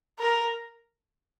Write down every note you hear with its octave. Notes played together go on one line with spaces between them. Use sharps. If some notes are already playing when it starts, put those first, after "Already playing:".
A#4